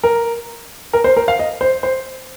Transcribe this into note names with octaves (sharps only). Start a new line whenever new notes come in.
A#4
A#4
C5
A#4
F5
D#5
C5
C5